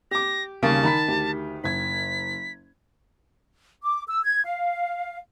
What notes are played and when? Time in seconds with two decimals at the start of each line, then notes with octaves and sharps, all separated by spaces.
0.11 G4 D6 A#6
0.63 D#2 C#3 G3 A#3 A5
0.83 D#3 A#5 B5 B6
1.08 D2 G4
1.64 F#1 G#6 B6
3.83 D6
4.07 E6
4.24 G#6
4.45 F5